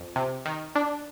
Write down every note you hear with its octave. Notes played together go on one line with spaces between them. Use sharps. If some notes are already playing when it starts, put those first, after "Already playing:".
Already playing: F2
C3
D#3
D4